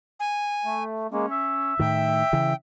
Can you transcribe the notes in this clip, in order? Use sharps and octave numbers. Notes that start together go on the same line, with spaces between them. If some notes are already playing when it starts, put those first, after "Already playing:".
G#5
A3
G#3 A#3 C#4
E5
A2 D#3 G5
C#3 E3